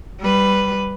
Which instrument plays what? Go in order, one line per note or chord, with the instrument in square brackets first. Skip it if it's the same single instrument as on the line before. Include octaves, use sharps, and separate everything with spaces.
[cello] G3 B4